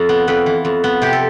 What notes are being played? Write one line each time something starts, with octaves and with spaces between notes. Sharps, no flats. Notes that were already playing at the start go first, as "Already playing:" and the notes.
Already playing: F2 A4
B3
F2 B4
E3
F2
B3
C3 G4
A4